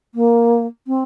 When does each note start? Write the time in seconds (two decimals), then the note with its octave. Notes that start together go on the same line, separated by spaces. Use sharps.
0.15 A#3
0.87 C4